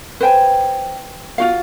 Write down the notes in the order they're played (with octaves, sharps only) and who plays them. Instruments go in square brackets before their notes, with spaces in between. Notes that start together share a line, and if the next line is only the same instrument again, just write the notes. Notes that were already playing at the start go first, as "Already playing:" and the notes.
[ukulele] B4 C5 G5 G#5
F4 F#4 F5